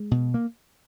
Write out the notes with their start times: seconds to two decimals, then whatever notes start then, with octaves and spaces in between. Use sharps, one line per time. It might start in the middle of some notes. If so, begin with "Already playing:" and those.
Already playing: G#3
0.11 B2
0.34 A#3